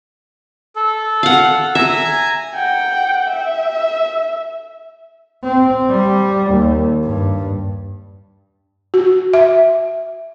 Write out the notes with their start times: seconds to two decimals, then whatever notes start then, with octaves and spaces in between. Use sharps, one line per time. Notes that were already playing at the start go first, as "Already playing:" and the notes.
0.76 A4
1.23 F5 F#5
1.75 E5 G#5 A#5
2.54 F#5 G5
3.30 E5
5.44 C4
5.90 G3
6.52 D#2
7.04 G2
8.94 F#4
9.33 E5